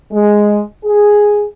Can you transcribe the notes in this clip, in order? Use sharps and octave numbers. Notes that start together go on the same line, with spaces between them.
G#3
G#4